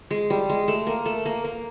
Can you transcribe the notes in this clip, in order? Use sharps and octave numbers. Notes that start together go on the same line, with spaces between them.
G#3
G3
G#3
A3
A#3
A3
A#3
A#3